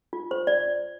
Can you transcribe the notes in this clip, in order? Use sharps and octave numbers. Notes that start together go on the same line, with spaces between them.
F4
C5
D5